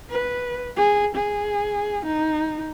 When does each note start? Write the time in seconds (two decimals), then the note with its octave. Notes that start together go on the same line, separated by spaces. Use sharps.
0.10 B4
0.76 G#4
1.15 G#4
2.06 D#4